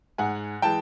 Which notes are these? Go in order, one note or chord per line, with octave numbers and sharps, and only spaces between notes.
G#2 F#5 G#5
E3 G#3 G5 A5